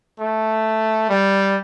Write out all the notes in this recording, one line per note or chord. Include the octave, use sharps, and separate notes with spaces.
A3
G3